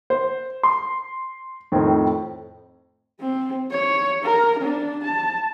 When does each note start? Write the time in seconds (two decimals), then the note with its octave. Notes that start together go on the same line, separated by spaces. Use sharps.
0.10 C5
0.63 C6
1.72 F2 A2 D#3 C4
3.19 C4
3.71 C#5
4.24 A#4
4.59 D4
5.04 A5